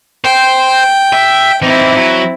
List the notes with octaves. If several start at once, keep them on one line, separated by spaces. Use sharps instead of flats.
C5 G5
E5
E3 C4 D#4 E4
F#3